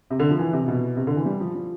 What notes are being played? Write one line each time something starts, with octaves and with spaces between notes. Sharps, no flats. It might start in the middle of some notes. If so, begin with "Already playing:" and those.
C3
D3
F3
E3
C3
B2
C3
D3
E3
G3
F3
F3